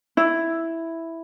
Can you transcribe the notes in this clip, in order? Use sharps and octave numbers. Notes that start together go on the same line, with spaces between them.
E4